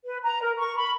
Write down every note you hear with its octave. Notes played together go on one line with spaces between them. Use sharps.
B4
A#5
A#4
C#6
B5